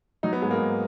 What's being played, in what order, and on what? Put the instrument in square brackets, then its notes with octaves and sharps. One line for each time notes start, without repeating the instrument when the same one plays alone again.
[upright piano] F#3 D#4
B3
G#2 G#3
A#3
G#2